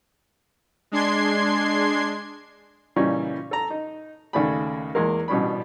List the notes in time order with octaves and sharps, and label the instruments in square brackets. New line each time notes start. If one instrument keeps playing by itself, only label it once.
[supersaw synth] G#3 D4 C6 G#6 C7
[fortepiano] A#2 C#3 E3 G3 C#4 D#4
A4 A#5
D#4
D#2 C#3 A3 D5 G#5 B5
E2 G#3 A#3 A#4
A1 B2 G3 C#4 D4 B5